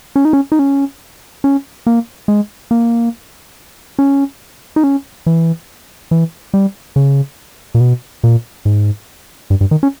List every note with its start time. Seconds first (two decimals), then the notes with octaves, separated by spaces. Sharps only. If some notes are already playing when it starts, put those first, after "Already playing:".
0.16 C#4
0.25 D#4
0.33 C#4
0.52 D#4
0.59 C#4
1.44 C#4
1.87 A#3
2.28 G#3
2.71 A#3
3.99 C#4
4.76 D#4
4.84 C#4
5.26 E3
6.11 E3
6.54 G3
6.96 C#3
7.75 A#2
7.81 B2
8.24 A#2
8.65 G#2
9.50 G2
9.61 G2
9.71 D#3
9.83 C#4